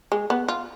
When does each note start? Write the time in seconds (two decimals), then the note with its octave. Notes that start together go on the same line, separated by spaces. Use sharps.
0.12 G#3
0.30 B3
0.48 F4